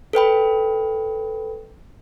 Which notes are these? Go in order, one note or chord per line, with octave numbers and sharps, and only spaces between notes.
A4 B4 G5 B5